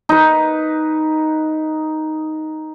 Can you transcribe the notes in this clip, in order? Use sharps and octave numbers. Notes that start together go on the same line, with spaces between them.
D#4 B4